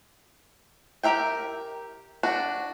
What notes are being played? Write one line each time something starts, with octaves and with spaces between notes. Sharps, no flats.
G4 A#4 E5 G5
D4 F#4